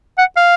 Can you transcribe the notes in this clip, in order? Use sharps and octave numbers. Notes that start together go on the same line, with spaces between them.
F#5
F5